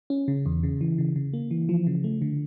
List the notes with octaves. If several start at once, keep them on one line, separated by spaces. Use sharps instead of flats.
C#4
C#3
E2
C#3
E3
C#3
C#3
A#3
E3
F3
C#3
A3
D3